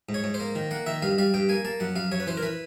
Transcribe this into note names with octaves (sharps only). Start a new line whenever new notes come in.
G#2
C#5
G#2
C5
A#3
D#3
A#3 F#5
D#3 E5
G2 F5
G3 F5
G2 G5
A#3 G#5
A#3 A5
F#2 F#5
F#2 F5
F#2 C#5
B4
E3 C5
A#4
E3 B4